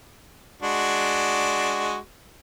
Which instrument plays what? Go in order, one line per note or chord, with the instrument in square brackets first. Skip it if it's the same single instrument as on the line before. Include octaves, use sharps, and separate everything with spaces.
[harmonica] G#3 D4 F#4